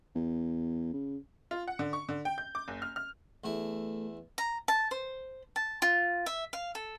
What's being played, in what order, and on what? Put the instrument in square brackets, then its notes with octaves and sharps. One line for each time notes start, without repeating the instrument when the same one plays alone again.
[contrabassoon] E2
C#3
[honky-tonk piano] F4
F#5
D3
C#6
D3
G5
G6
D6
F#1
F6
F6
[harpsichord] E2 E4 [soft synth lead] A3
[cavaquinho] A#5
A5
C5
A5
F4
E5
F5
A4